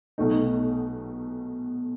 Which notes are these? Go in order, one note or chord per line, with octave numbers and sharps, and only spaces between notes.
B1 B2 A3 D#4